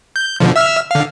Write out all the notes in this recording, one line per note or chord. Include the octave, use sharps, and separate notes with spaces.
G6
B2 D3 F3
E5 E6 F6
D3 F5